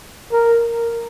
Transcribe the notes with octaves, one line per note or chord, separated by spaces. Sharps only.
A#4